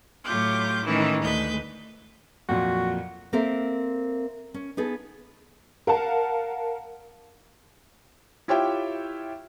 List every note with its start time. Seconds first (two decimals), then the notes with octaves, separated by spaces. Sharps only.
0.25 A2 F#3 F4 G4 D6 G6
0.84 A2 D#3 E3 G#3 C#4 E4
1.21 D2 G#3 B4 G6
2.49 F2 A#2 F#3 F#4
3.33 A#3 C4 A4 A#4 C5 E5
4.54 C#4
4.77 B3 D#4 G#4 A4
5.87 A#4 F5 F#5 A5
8.48 E4 F4 G4 C#5 E5 G5